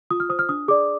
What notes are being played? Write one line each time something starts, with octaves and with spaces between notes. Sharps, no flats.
F4 D#6
F6
C5 D#6
F6
D4 D#6
G#4 D5 D6